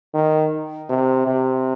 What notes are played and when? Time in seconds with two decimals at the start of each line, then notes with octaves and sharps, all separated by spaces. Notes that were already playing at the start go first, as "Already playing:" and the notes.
0.14 D#3
0.89 C3
1.27 C3